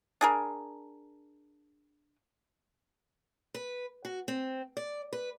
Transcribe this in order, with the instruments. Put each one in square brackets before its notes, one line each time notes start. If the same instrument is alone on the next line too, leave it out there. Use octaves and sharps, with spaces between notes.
[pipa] D4 G#4 A#4
[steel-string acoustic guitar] B4
F#4
C4
D5
B4